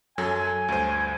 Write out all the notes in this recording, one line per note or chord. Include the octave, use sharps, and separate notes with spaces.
F#2 F#3 A4 G#5
D2 G2 C5